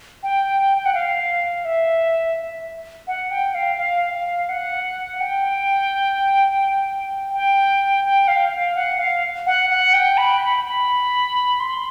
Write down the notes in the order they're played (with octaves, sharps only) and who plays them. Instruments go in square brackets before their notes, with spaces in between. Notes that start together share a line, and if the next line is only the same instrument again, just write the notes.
[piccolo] G5
G5
F#5
F5
E5
F#5
G5
F5
F5
F5
F#5
G5
G5
G5
F5
F5
F#5
F5
F#5
F#5
G5
B5
B5
B5
C6